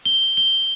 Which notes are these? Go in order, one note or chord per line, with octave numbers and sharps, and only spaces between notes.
G7
G7